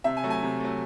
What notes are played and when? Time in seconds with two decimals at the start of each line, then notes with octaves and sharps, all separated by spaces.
0.04 C3 E5
0.17 G#5
0.23 F#3 A3
0.30 G#5
0.43 C3
0.60 F#3 A3